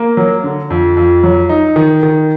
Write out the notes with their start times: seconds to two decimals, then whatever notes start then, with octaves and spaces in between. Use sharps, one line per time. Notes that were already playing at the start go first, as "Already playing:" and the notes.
Already playing: A#3
0.17 F#3
0.44 D3
0.70 F2
0.97 F2
1.24 F#3
1.49 D#4
1.76 D#3
2.03 D#3